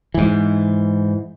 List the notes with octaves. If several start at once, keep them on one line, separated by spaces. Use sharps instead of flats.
G#2 E3